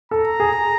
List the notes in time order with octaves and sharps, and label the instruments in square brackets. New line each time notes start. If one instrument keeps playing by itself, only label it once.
[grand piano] A4 [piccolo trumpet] A#5
[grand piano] G#4